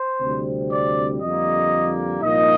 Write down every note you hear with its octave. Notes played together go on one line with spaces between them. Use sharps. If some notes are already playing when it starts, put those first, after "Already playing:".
Already playing: C5
D2 C3 G3 C4
D5
F2 D3 G3 A#3 D#5
C2 A#2 F3 A#3 D#4 D#5